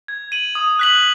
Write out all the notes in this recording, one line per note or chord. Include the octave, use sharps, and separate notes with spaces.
G#6
D#7 F#7
D#6
F#6 B6 F#7